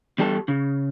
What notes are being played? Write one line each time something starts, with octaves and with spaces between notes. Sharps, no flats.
E2 G3 G4 A4 A5
C#3